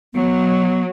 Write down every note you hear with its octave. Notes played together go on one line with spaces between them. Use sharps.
F#3 B3